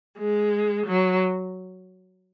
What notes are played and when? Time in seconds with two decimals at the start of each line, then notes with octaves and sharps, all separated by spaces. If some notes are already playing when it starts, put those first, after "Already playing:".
0.18 G#3
0.87 F#3